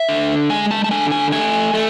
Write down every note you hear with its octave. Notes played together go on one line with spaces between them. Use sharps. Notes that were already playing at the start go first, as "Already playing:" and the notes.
Already playing: E5
D3
G#3 G#5
A5
A5
D3 G#5
G#5
A3 G#5
A3